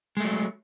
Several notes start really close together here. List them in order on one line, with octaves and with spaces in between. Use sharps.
G#3 A3 F#3